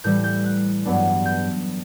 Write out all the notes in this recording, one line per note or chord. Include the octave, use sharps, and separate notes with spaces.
A2 E3 G3 G6
G6
F#6
G2 F#3 B3 D4
G6